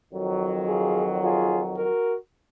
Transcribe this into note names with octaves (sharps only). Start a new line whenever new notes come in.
F2 D#3 F#3
F4 G#4
F4 G#4
F#4 A#4